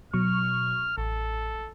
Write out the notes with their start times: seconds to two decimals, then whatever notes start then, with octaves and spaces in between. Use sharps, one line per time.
0.13 B2 F#3 C#6 F6
0.98 A1 A4